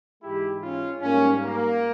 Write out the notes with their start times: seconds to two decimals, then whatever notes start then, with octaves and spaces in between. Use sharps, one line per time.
0.22 G#2 E3 G#3 E4 G4
0.61 C#4 F4
1.01 G#2 G3 A#3 C#4
1.42 A#3